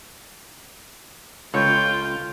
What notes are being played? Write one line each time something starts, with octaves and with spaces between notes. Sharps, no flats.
C#2 F4 A4 C#5 G5